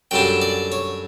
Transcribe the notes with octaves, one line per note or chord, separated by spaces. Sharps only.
F#2 D3 G3 D4 G5
D5
C#5